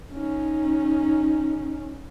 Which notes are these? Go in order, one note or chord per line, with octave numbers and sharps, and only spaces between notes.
C#4 D#4